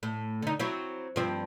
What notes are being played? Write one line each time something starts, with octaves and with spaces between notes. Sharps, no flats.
A2
D3 D#4
F#3 C4 E4
G2 F3 C4